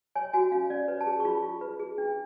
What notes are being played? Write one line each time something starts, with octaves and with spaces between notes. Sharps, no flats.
C#5 G#5
F#4 G#5
C#4 F5
C#4 D5
B4 C#5
A5
G#4
A5
C#6
F4 B5
F4
B4
G#4
D4